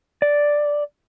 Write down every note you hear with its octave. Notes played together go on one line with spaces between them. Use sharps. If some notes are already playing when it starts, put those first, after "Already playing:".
D5